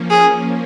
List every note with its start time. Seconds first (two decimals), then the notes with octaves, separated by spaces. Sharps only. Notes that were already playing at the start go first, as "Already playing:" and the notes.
Already playing: F3 A#3 C#4
0.10 G#4